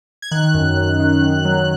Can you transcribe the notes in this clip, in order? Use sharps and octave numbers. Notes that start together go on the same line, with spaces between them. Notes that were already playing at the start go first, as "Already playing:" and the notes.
G#6
D#3 F#6
F#2
F#2
D#3
F#2
F#3